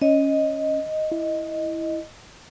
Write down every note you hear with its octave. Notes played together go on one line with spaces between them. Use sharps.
C#4 D#5
E4